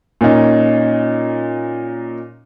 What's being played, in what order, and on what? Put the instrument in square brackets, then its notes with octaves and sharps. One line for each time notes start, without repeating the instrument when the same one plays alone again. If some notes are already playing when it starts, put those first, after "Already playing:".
[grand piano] A#2 C#4 D#4